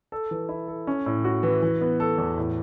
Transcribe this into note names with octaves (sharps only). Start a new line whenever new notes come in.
A4
E3
E4
A4
C#4
A2
F#4
E3
E3
B3
A4
E2
A2